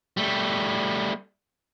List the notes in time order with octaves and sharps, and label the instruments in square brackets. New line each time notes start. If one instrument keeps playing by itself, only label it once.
[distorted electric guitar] G3 A3